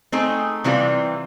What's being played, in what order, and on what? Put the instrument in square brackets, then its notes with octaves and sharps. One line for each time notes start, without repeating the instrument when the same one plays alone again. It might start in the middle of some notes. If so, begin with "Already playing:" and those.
[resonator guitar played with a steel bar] A3 C4 D#4 G#4
C3 E3 G3 C4 F4